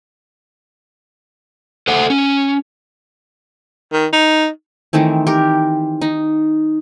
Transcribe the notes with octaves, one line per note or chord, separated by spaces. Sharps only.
A4 C5 F#5
C#4
D#3
D#4
D#3 E3 A3 C4
G4 A#4
D#4